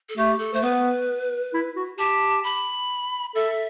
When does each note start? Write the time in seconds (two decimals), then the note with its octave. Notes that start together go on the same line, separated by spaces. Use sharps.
0.09 A4
0.17 A3 G4
0.39 A4
0.54 A3 C5
0.63 B3 B4
1.53 E4
1.76 F#4
1.98 G4 A5
2.44 B5
3.35 A4 E5